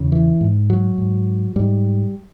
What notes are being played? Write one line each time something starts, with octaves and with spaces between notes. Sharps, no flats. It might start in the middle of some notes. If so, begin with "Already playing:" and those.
Already playing: E2 C#3
E3
G#2
F#3
G#2
G#2 G3